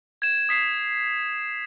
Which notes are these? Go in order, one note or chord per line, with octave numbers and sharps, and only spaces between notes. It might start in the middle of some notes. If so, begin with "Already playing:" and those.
G#6 E7
D#6 B6 C7 E7